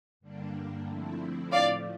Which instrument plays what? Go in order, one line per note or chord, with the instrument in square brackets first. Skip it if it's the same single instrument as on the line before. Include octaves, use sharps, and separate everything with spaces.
[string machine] G2 D3 G3 A#3 D4
D3 F3 A3 C4 E4
[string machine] A2 F3 A3 [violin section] D5 F5